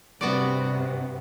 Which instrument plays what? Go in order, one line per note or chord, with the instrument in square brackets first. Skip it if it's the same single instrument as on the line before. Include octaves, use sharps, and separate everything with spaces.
[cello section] G2 C3 [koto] B3 F#4 D5